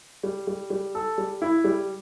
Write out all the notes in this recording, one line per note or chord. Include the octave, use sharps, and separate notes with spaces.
G3
G3
G3
A4
G3
E4
G3